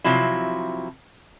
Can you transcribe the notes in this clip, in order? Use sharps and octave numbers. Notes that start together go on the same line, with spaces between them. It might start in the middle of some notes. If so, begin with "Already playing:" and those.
C3 F3 F#3 E4